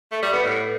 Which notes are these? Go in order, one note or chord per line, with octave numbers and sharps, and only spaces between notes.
A3
G3
B3
A2